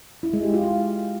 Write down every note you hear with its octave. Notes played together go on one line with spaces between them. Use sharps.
E4
G#3
G4
F4
F4